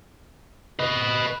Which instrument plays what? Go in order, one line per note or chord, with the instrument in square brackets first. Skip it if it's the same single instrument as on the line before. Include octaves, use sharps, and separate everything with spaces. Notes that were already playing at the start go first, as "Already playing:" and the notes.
[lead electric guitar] B4 D#5